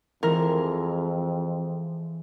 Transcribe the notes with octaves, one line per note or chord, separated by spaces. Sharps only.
F2 E3 G#3 A#4